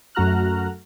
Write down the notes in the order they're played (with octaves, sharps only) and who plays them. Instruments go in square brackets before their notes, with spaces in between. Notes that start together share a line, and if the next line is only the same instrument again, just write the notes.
[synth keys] F#2 A3 F#4 A#5 F6 F#6